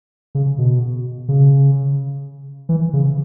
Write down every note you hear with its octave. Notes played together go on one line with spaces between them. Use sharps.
C#3
B2
C#3
E3
C#3